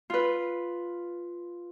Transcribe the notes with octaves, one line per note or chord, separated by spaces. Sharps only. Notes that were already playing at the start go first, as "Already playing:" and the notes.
F4 B4